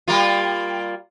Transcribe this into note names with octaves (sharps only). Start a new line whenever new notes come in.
G3 A#3 F4